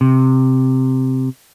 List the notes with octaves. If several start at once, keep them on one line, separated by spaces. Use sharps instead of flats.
C3